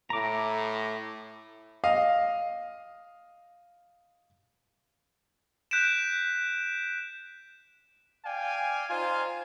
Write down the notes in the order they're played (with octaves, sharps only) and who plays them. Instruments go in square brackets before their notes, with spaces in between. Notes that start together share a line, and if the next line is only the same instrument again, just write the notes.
[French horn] A2 [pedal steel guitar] A#5 D6
[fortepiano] D#5 F5
[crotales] F#6 G6 B6 D7 E7
[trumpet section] D5 F5 G5 G#5
D#4 F4 C5 G#5